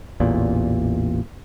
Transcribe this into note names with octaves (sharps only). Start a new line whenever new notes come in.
A1 E2 A#2